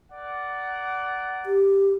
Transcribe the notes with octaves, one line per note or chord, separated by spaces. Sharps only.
A#4 D5 F#5
G4